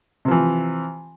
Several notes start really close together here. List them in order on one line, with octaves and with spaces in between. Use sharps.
C3 F3 E3